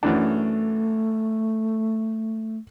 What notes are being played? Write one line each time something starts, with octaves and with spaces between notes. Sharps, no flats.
F#2 E3 A3 D4